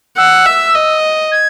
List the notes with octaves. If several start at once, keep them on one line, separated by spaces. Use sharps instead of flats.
F#5 E6
E5
D#5
G#6